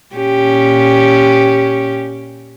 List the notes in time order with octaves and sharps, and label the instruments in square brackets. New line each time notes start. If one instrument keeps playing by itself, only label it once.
[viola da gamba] A#2 C#4 G4